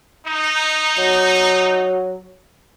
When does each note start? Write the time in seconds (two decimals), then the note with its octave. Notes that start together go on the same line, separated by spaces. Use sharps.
0.25 D#4
0.98 F#3